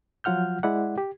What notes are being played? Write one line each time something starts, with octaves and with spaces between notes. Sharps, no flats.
F3 F#3 F4 F#5 F6 G6
G#3 E4 D5 F#5
G4